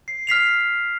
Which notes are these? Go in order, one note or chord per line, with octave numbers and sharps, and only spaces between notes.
C7
F6 B6 C7 F7